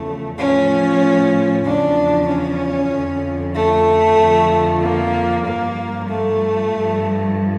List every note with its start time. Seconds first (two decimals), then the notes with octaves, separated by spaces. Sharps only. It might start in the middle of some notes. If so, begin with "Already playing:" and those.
Already playing: E2 C#3 F3 A3
0.37 A2 F3 C#4
1.64 E2 C#3 F3 D4
2.27 C#4
2.91 F2 D3 F3
3.54 A3
4.18 F2 D3 F3
4.81 A#3
5.45 G2 F3 A#3
6.08 A3
6.72 G2 F3